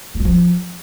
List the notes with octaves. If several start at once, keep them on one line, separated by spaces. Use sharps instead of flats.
A3
F#3
F3